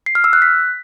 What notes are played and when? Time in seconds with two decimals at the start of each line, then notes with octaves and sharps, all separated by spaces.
0.06 C7
0.15 F6
0.24 E6
0.33 F#6
0.42 B6